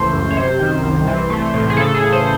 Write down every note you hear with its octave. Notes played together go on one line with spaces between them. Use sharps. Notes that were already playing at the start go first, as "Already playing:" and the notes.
Already playing: C#2 E3 A3 C5
F#2
C#5
C3 C5
D#3
C2
E3
A3
A2
G#4
C#3 A4
G#4
E3
C5